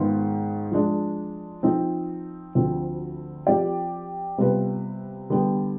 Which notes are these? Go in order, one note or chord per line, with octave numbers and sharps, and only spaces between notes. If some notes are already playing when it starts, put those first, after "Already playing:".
Already playing: G#2 D#3 G#3 B3 F4
F3 G#3 D4
F3 C4 D#4
D2 D3 F3 C4
F3 C4 G4 D5
C3 G3 B3 F4 B4
D3 G3 B3